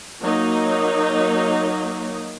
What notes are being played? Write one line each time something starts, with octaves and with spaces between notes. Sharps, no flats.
F#3 A#3 D#4